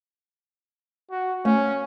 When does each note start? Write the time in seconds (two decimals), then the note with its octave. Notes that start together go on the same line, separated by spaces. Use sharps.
1.11 F#4
1.45 A3 C#4